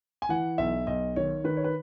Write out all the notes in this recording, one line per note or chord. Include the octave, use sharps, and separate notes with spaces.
G#5
E3 F#5
B1 E5
B1 D#5
D#3 C#5
D#3 B4
C#5
B4